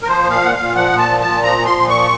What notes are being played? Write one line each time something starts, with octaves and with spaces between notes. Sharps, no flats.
A#4
F3 C5
A#2
F5
A#2 F#5
F5
A#2
F3 F#5
A#2
A5
F3
A5
A#2
F3 A#5
F3
C6
A#2
F3 C#6